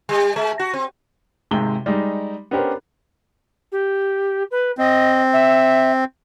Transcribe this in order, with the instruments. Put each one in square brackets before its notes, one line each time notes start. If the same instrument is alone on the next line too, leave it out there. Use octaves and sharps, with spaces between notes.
[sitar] G3
G#3
F#4
C4
[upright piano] G#1 G#2 C3 G#3 G5 G7
G3 G#3 D#4
B3 C#4 D4 G4 A#4 C5
[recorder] G4
B4
[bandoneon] C4 [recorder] D#5
[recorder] E5